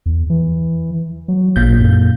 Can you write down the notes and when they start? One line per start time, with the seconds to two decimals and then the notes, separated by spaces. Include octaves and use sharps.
0.06 E2
0.30 E3
1.28 F#3
1.56 A1 A#2 G6
1.79 F#2